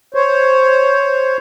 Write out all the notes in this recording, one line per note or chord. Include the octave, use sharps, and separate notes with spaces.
C5 C#5